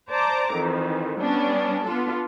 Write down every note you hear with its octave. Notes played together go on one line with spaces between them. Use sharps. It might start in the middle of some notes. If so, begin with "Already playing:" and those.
C5 D5 A5 A#5 D6
F2 D#3 E3
G3 B3 C#4 D4
B3 D4 F4 A4